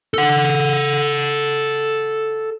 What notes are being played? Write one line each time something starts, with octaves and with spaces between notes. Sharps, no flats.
A4 F#5